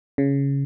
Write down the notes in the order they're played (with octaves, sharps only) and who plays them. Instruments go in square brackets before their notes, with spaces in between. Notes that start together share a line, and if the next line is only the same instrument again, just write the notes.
[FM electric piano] C#3